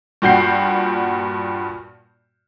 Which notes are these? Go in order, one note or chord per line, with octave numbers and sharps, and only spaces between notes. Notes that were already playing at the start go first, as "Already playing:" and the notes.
G2 A#2 F#4 G5 G6 C7